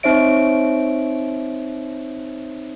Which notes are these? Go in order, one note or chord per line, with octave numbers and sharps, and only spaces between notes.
C4 D#4 C5 C#5 E5 D7